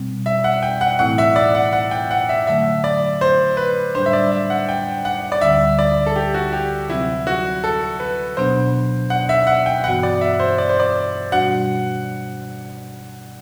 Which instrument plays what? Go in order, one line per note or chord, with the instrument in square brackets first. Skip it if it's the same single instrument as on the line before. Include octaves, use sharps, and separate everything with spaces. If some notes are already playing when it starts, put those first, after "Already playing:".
Already playing: [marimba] B2 G3 C4
[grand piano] E5
F#5
G5
F#5
[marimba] A2 E3 A3 C4 E4 [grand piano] F#5
[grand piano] E5
D5
F#5
F#5
G5
F#5
E5
[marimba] D3 F#3 A3 [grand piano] E5
[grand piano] D5
C5
B4
[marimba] A2 G3 D4 [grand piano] C5
[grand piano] E5
D5
E5
F#5
G5
F#5
D5
[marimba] D2 D3 G3 [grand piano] E5
[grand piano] D5
A4
G4
F#4
G4
[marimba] C3 F#3 C4 [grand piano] E4
[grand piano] F#4
A4
B4
[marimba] B2 F#3 B3 D4 [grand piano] C5
[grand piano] F#5
E5
F#5
G5
[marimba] G2 E3 B3 F#4 [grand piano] F#5
[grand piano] D5
E5
C5
D5
C5
D5
[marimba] B2 G3 D4 F#4 [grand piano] F#5